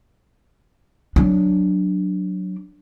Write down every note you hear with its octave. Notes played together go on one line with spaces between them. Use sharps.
F#3 D4